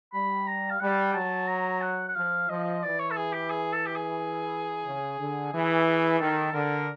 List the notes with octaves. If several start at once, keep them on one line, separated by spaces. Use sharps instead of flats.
G3 B5
A#5
F5
G3 F#5
F#3 A5
A#5
F#5
F#5
F3 F5
F3 D#5
E3 D5
C#5
A4
G#4
G4
G#4
A4
G4
G#4
C#3
D3
E3 G#4
G#4
D#3 A4
D3 A#4